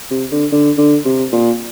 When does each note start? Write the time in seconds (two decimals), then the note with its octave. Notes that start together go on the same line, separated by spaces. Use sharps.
0.11 C3
0.32 D3
0.52 D3
0.78 D3
1.05 C3
1.32 A#2